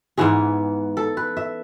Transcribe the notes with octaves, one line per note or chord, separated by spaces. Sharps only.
G#2 E3 B3 G#4
A4
B4
E5